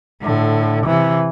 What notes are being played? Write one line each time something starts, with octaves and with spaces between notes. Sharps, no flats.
A2 D3
C3 E3